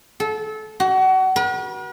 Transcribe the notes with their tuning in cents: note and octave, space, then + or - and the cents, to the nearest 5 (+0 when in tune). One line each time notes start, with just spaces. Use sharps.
A4 -25
F#4 +30
B4 -45